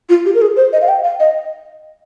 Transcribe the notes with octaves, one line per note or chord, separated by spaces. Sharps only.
F4
G4
A#4
G#4
C5
D#5
F5
G5
F5
D#5